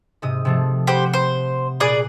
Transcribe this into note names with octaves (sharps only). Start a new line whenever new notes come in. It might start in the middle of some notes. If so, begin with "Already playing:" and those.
G#2 C3 D#6
C3 F3 A3
G4 C5 F#5
C5
A#2 G#4 D5 D#6 F#6